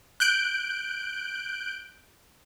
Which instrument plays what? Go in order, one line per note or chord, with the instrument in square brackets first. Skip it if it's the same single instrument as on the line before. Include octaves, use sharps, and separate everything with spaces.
[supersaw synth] F#6 G6 D7